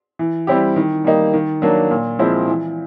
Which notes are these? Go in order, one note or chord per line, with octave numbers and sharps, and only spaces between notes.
E3
G3 C4 E4 G4
D#3
G3 A#3 D#4
D#3
F#3 A#3 D4
A#2
F3 G#3 C4 E4
E3